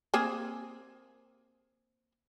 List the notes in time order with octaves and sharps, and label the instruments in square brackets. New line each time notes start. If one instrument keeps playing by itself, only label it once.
[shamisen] A#3 C4 G#4